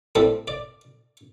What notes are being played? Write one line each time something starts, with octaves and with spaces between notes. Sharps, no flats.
A2 G3 C4 A4
D5